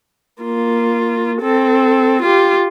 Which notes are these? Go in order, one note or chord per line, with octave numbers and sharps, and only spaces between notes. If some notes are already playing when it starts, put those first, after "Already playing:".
A#3 F4
C4 A4
F4 G4